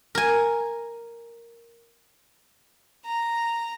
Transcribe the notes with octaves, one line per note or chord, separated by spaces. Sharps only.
A#4 G#5
A#5